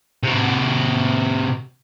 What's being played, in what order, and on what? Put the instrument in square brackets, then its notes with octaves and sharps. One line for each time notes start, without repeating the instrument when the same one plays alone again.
[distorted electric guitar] C3 F#4